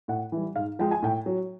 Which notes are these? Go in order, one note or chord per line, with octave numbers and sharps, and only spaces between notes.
A2 F#5
E3 G3
G#2 F5
F3 G#3 G5
G#5
A2 G5
F#3